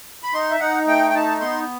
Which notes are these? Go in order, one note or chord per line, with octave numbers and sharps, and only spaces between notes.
B5
D#4 C6
E5
D#4 F#5
A3 G5
G5
D#4 A5
B3 C6